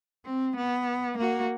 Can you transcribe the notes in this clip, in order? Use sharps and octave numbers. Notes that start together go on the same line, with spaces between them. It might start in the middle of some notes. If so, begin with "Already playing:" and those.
C4
B3
A#3 F#4